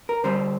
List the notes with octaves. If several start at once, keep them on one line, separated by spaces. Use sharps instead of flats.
A#4
D3 G3 C4 C5